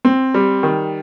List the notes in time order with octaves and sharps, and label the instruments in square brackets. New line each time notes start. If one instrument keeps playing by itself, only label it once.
[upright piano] C4
G3
D#3